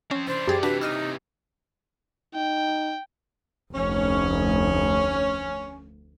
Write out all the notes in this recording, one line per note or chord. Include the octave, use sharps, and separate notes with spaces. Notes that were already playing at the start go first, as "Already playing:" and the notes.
F3 C4 C#4
E3 D4 C5
F#2 G4 G#4 A6
C3 E3 D4 F#4 B4 A5
D#4 E6 F6 D#7
D#4 G5
F1 D2 C#4